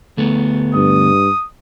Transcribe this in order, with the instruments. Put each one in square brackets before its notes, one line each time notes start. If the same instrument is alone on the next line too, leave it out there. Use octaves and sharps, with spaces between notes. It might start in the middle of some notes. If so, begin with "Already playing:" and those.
[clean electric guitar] D2 A3 B3
[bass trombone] G2 [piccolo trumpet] D#6